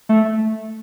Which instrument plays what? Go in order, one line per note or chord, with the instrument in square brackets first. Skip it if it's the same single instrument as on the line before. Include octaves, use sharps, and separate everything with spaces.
[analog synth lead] A3